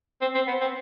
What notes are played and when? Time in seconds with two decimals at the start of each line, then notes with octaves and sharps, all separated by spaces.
0.21 C4
0.34 C4
0.47 B3
0.61 C4